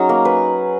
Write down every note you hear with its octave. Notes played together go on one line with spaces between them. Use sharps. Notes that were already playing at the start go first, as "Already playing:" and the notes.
Already playing: F#3 C#4 D#4 G#4
A#3
B4